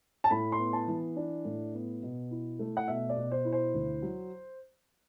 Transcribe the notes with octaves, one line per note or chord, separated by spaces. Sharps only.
A5
A2 B5
C6
B3
A5
E3
D4
A2
B3
B2
E4
A3
F#5
B2 E5
D5
B2
C5
E4
C5
D2
F#3